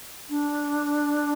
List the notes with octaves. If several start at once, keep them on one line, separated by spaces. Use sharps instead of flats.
D4